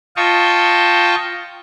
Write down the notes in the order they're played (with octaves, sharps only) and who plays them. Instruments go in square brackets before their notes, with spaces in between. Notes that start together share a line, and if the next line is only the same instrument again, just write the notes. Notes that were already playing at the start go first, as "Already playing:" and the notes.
[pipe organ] F4 D#5 F5 G5 A5 C#6